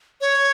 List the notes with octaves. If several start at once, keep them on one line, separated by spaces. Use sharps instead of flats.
C#5